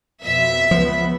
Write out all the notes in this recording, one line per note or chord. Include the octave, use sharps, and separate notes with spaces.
F2 B2 E5
C#2 F3 B3